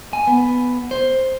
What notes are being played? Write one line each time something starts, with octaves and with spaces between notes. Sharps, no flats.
G#5
B3
C5